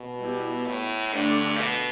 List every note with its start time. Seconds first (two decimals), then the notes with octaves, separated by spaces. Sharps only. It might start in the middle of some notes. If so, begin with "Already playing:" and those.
Already playing: B2
0.20 G3 B3 E4
0.67 A2
1.13 G2 D3 A3 D4
1.59 B2